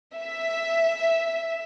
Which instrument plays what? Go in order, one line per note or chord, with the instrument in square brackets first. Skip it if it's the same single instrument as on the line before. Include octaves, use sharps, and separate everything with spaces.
[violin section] E5